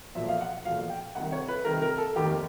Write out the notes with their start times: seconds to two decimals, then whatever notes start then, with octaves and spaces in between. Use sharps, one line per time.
0.15 B1 A#2 F3 E5
0.28 F5
0.41 F#5
0.65 B1 A#2 F3 F5
0.90 G5
1.15 C2 C3 D#3 F#5
1.32 C#5
1.48 B4
1.65 C2 C3 D#3 A#4
1.82 A#4
1.98 A4
2.15 F1 D#2 D#3 G4